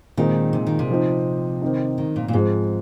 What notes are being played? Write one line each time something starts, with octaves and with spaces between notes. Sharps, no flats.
A#2 D#3 G#3 C4 D#4
C3
D#3
C3
F3 C4 D#4
D#3 C4 D#4
D#3
A#2
A#2
G#2 F3 G#3 C4